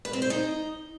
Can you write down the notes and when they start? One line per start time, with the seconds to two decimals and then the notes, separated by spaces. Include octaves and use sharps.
0.05 B4
0.13 C4
0.22 C5
0.30 D#4